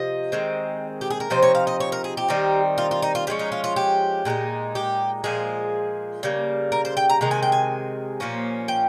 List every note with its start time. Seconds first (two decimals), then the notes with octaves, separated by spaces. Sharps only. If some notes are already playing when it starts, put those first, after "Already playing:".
Already playing: C3 F3 D#5
0.32 D#3 G#3 C4
1.01 G4
1.10 G#4
1.20 A#4
1.30 C3 F3 C4 D#4 C5
1.42 C#5
1.55 F5
1.67 D#5
1.80 C#5
1.92 A#4
2.04 G#4
2.17 G4
2.28 D#3 G3 C4 D#4
2.78 F4
2.91 F4
3.02 D#4
3.15 F4
3.27 F3 G#3 C#4 G4
3.39 D#4
3.52 F4
3.64 F4
3.76 G4
4.25 A#2 G#3 C4 D#4
4.75 G4
5.24 A#2 F3 G#3 G#4
6.23 C#3 G3 A#3
6.72 A#4
6.85 C5
6.97 G5
7.09 A#5
7.21 C3 D#3 G#3 A#5
7.31 G#5
7.43 G5
7.52 G#5
8.20 A#2 F3 A#3 C#4
8.68 G5